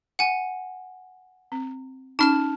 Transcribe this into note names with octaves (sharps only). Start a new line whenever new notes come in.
F#5 G#5
C4
C#4 D#4 A5 F6 E7